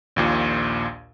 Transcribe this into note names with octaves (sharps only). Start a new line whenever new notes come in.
A#1 D#2 A#2